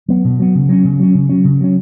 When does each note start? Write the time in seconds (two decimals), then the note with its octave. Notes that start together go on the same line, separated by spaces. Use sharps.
0.08 F#3 B3
0.24 B2
0.39 F#3 B3
0.55 C#3
0.69 F#3 C#4
0.85 C#3
1.00 F#3 C#4
1.14 C#3
1.29 F#3 C#4
1.45 C#3
1.61 F#3 C#4